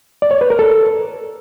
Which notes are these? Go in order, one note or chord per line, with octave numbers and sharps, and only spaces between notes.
D5
C#5
B4
A#4
A4